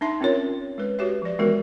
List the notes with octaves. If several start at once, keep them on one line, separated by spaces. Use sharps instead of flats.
D4 D#4 E5 C6
C4 C#4 F4 A#4 C#5
G#3 B4
F#4 G4 B4 C#5 E5
F3 D5
E3 G#3 B3 F#4 A#4